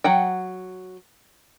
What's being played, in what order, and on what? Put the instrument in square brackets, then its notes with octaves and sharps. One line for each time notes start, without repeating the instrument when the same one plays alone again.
[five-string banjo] F#3 F#5 G5